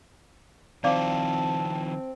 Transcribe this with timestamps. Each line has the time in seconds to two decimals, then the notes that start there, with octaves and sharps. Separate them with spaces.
0.84 D#3 F3 C4 D5 F5 A5 D6